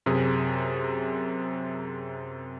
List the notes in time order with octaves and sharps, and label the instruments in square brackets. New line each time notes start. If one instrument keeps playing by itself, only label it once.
[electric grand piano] F#2 C3 G#4